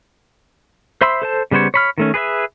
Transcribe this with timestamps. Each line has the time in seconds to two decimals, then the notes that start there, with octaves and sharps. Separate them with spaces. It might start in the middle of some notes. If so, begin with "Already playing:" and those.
1.01 C5 E5 B5 C6 E6
1.22 A4 C5 A5
1.51 C#3 G3 B3 C5 C#5
1.74 C#5 B5 F6
1.98 D#3 A3 C#4
2.14 G#4 B4 D5 E5